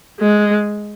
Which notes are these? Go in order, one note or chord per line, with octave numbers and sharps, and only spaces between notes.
G#3